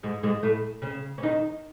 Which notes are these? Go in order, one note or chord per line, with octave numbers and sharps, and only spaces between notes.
G#2 G#3
G#2 G#3
A2 A3
C#3 C#4
C#4
D#3 D#4